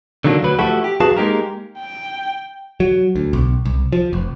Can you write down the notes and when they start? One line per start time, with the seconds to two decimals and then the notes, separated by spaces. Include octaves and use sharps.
0.24 D3 D#3 F#3 A#3 D4
0.43 D2 F#3 B4
0.59 F3 A3 E4 F#4 G4 A4
0.84 G4
1.00 F#2 F#4 G#4 B4 F5 A5
1.17 G#3 A#3 D#4 G4 A#4
1.79 G5
2.80 F#3
3.16 D2
3.33 B1
3.65 C2
3.92 F3
4.13 F1